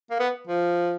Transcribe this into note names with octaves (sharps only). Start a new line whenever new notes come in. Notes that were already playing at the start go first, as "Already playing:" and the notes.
A#3
B3
F3